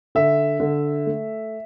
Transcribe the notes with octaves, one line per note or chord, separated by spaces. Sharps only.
D3 E5
D3
A3